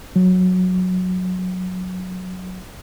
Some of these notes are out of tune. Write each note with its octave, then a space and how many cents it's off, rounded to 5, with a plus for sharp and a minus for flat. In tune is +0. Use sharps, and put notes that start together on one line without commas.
F#3 -15